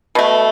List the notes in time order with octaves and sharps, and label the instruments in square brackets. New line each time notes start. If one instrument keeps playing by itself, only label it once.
[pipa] B2 A3